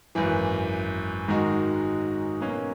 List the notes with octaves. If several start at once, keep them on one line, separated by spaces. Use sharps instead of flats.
G#1 F#2 E3
G#2 D#3 G#3 D#4 F#4
B2 F#3 A#3 C#4